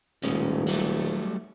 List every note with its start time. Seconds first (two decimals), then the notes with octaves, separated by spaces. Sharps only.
0.23 D#1 A2 G#3 C#4
0.67 F#3 G3 A3